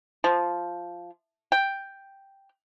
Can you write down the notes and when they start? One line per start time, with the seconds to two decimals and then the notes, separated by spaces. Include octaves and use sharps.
0.24 F3
1.52 G5